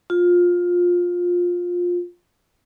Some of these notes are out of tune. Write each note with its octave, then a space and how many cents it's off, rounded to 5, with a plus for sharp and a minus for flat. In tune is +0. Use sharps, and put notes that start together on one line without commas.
F4 +15